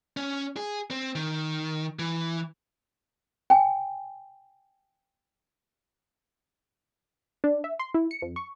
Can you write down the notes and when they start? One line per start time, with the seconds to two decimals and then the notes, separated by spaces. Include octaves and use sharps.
0.17 C#4
0.56 G#4
0.91 C4
1.15 D#3
1.99 E3
3.50 G5 G#5
7.44 D4
7.64 E5
7.79 C6
7.94 E4
8.11 C#7
8.22 F2
8.36 C#6